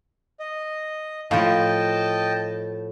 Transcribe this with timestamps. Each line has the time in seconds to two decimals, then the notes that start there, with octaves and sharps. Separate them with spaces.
0.40 D#5
1.31 A2 F3 F4 D#5 G5 A5